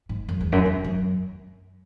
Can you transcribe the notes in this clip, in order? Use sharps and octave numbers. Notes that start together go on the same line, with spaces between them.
G#2
F#2
E2
F#2
E2
F#2